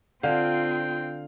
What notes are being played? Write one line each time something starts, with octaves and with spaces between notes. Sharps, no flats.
D3 C4 F4 F5 G5